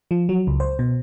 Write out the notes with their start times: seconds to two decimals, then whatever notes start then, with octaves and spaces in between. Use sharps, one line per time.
0.11 F3
0.29 F#3
0.47 C#2
0.60 C5
0.79 B2